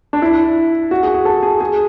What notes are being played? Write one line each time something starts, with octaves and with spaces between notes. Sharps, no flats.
D4
E4
F#4
G#4
G#4
A4
G#4
G#4